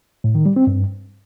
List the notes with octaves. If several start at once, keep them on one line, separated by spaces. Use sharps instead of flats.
A2
D#3
G3
C4
G2